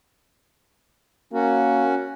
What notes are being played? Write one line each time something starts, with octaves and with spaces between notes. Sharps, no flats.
A#3 C#4 F#4